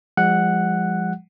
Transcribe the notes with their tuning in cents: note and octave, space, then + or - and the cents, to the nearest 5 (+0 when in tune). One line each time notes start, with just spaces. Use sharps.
F3 +0 G#3 -40 F#5 +0